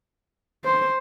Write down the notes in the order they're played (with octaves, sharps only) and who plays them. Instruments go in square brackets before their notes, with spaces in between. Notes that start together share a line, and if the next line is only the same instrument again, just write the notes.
[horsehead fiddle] C5